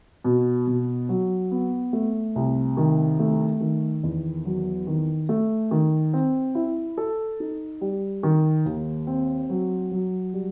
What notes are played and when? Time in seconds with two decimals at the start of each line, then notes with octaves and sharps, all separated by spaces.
0.24 B2
0.67 B2
1.09 F#3
1.51 B3
1.93 A3
2.36 C2
2.77 D#3
3.20 A3
3.61 D#3
4.03 E2
4.45 F#3
4.87 D#3
5.29 A3
5.71 D#3
6.14 C4
6.55 E4
6.97 A4
7.40 D#4
7.81 G3
8.23 D#3
8.66 D#2
9.07 C4
9.50 F#3
9.91 F#3
10.33 G3